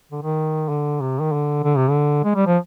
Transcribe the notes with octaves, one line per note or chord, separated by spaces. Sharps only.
D3
D#3
D3
C3
D#3
D3
D3
C3
D3
G#3
G3
F3